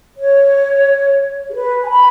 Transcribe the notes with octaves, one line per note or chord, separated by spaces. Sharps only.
C#5
G#4
B4
G#5
B5